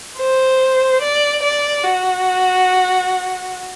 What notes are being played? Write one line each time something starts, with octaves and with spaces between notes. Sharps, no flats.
C5
D5
D5
F#4